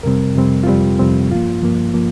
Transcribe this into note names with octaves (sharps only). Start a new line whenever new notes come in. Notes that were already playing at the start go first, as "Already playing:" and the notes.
F2 C3 G3 C4 A#4
F2 C3 G3 C4
F4
F2 C3 G3 C4 G4
F2 C3 G3 C4
G2 F3 A#3 F4
G2 F3 A#3
F3 A#3